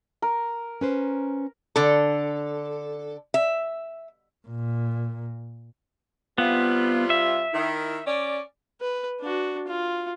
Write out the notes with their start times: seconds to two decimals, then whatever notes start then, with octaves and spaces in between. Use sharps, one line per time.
0.22 A#4
0.81 C#4 B4 C5
1.76 D3 A4
3.34 E5
4.48 A#2
6.38 C3 G3 B3 F4
7.10 E5
7.54 D#3 E4
8.07 C#4 D5
8.81 B4
9.20 D4 F#4
9.67 F4